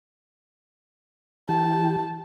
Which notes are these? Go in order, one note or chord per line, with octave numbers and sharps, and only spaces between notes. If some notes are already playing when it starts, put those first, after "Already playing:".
E3 G4 A5